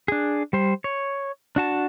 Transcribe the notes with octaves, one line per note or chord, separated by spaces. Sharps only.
D4 G#4
G3 C5
C#5
D4 F#4 A5